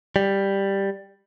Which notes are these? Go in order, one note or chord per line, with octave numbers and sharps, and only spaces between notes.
G3